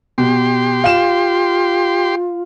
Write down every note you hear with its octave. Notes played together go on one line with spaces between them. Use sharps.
B2 G4 C6
F4 F5 E7